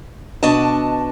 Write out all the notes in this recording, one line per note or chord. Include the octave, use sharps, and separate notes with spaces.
B2 D4 F#4 D#5 A5